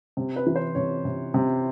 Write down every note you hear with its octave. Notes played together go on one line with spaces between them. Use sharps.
C3
B4
E3 B4
C5
C3 C#5
C3
C3